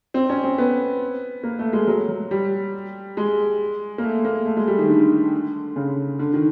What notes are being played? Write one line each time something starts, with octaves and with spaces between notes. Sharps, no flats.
C4
C#4
C4
B3
A#3
A3
G#3
F#3
F#3
G3
G#3
A#3
A3
A#3
A3
G#3
G3
D#3
D3
C#3
D3
D#3